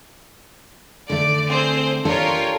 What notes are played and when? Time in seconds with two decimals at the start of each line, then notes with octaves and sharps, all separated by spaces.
1.10 D3 A3 D5
1.46 C4 G#4 C5
2.05 D4 F4 G4 A4 A#4 C#5